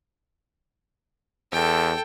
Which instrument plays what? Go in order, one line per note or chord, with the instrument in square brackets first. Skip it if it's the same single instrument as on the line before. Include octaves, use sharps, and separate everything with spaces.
[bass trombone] E2 [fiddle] A4 G5